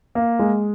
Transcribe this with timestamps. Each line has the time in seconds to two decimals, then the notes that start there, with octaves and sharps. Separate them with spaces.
0.15 A#3
0.39 G#3